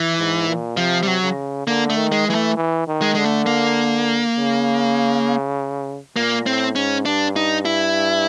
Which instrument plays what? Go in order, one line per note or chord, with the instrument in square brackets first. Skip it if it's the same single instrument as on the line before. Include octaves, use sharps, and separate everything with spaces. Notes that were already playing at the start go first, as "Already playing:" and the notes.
Already playing: [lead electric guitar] E3
[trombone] G#2
A#2
[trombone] C3 [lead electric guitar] F3
[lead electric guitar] G3
F#3
[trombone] C#3
[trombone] D3 [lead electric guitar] A#3
[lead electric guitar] A3
[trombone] D#3
[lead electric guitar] G#3
[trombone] E3 [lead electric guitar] G#3
[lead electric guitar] A3
[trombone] E3
D#3
[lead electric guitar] G#3
[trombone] D3 [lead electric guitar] G#3
[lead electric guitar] A3
A#3
[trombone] C#3
[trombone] A#2 [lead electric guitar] A#3
[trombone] A2 [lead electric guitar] C4
[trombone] G#2 [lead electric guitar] C#4
[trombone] G2 [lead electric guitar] D4
[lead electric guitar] D#4
E4